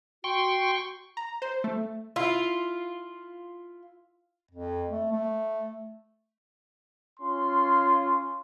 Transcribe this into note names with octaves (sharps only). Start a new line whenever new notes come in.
F#4 G5 C6 C#6
A#5
C5
A3
E4 F4 F5
F2
A3
A3
C#4 F4 C6